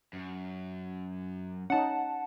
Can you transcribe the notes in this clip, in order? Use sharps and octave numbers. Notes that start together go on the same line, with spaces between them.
F#2
C#4 D#4 F#5 A5